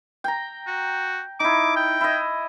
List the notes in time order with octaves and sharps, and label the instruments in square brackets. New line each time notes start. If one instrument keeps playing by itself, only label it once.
[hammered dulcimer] G5 A#5
[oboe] F#4
[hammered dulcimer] D#4 E4 [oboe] D6
[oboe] G5
[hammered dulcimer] E4 D#5